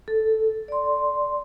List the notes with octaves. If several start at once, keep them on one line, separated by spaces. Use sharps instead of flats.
A4
D5 C6